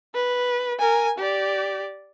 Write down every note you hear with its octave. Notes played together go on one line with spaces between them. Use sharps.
B4
A#4 G#5
G4 D5